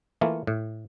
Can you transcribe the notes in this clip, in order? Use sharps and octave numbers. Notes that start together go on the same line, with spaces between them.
E3 A3 A#3 F4
A2